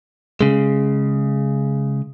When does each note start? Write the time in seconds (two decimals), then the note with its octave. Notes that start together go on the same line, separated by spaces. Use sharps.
0.41 C#3 G#3